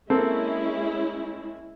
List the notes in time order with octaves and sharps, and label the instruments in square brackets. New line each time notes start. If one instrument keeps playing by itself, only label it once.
[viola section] G#3 C#4 E4 [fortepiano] A#3 C4 A4